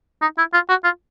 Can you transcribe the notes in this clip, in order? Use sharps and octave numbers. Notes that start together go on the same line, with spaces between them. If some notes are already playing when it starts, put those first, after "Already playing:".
D#4
E4
F4
F#4
F4